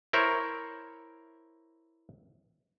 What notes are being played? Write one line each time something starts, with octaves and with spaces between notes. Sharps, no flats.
E4 A#4 C5 C#5